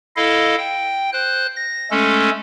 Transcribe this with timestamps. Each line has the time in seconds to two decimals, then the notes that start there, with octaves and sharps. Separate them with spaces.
0.16 E4 A4 D#5 F5
0.58 G5
1.13 C5 F#6
1.56 A#6
1.91 G#3 A3 C#4 A4